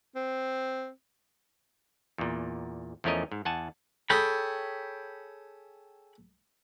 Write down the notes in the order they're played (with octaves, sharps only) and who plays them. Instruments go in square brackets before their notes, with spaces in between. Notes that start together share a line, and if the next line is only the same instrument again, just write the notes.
[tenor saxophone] C4
[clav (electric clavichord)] E2 A#2
E2 F3 A3 C#4 A#4 D#5
G#2
E2 F#5 G#5 A5
[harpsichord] G#4 A4 [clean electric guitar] C#5 G5 B5